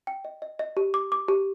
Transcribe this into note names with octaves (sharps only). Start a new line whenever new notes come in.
G5
D#5
D#5
D#5
G4
D6
D6
G4